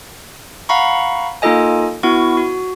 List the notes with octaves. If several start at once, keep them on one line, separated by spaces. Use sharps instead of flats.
F5 F#5 A#5 B5 C#6
A#3 D#4 F4 A4 D#5 G#5
B3 E4 F#4 C#6
F#4